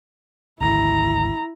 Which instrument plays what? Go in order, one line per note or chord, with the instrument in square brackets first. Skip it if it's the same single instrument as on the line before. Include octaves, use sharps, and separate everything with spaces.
[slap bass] G#1 D2 G#2 [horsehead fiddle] E4 A#5